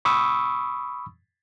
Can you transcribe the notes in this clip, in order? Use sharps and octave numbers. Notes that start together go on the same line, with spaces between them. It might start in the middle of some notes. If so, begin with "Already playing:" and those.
B5 C#6 D#6 E6